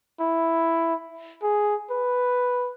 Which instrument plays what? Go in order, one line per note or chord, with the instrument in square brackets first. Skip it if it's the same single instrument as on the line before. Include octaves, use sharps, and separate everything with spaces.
[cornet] E4
G#4
B4